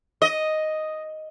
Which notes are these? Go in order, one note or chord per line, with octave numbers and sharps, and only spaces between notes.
D#5